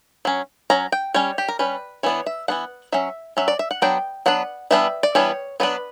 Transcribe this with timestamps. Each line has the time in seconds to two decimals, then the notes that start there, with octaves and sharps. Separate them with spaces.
0.25 F#3 C#4
0.70 F#3 C#4 A#5
0.92 G5
1.14 G3 C#4 C#5
1.38 G4
1.48 A#4
1.59 G3 C#4 B4
2.03 E3 B3 D4 C#5
2.26 E5
2.48 E3 B3 D4 F#5
2.92 F#3 C#4 E5
3.37 F#3 C#4 E5
3.48 D5
3.59 E5
3.71 F#5
3.82 F#3 B3 D4 G5
4.26 F#3 B3 D4 F#5
4.71 E3 G3 B3 D4 E5
5.03 D5
5.15 E3 G3 B3 D4 C#5
5.60 F#3 B3 D4 B4